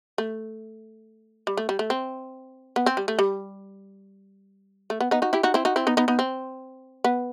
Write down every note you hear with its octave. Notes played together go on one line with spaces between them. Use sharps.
A3
G3
A3
G3
A3
C4
B3
C4
G3
A3
G3
A3
B3
B3 D#4
D#4 F#4
E4 G4
D#4 F#4
C4 E4
D#4 F#4
C4 E4
B3 D#4
B3 D#4
B3 D#4
C4
B3